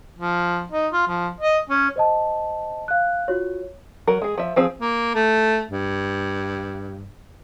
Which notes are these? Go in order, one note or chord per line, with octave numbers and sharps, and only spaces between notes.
F3
D#4
F4
F3
D#5
C#4
C5 D#5 A5
F5 F#6
F4 F#4 C#5
F#3 A#4
G#3 G#4
F3 E5
F3 C4 G#4
A#3
A3
G2